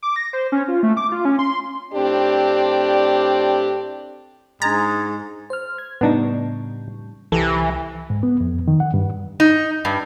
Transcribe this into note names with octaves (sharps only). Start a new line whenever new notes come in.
D6
A#6
C5
C#4
F4
A3
D6
F4
C#4
C6
A2 C4 D4 G4 D5
G#2 G#3 D4 A#5 G#6 A6
C5 F6
G#6
A2 C#3 G3 B3 D4 D#4
C2 E3 G4 A4 A#6
G#2
B3
F2
D#3
F#5
G2
D#4
G2